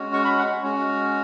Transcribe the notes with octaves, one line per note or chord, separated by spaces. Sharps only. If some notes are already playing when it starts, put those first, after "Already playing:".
Already playing: G#3 C#4 F#4
C#6
B5
F#5
G#3 C#4 F#4